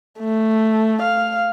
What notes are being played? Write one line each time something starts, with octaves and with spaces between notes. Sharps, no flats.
A3
F5